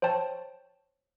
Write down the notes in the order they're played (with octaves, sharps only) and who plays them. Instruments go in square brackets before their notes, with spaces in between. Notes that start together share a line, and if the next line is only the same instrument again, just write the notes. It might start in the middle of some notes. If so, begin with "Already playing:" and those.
[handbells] C5 C#5 G5 A5